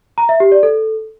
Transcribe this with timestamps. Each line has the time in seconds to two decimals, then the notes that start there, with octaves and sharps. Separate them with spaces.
0.18 A#5
0.29 E5
0.40 G4
0.52 D5
0.63 A4